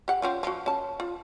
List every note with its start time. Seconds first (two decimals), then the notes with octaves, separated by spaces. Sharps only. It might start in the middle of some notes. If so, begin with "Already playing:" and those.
0.08 G4 F#5
0.22 C4 C#4 F4
0.43 F3 F#4
0.66 C#4 A5
1.00 F4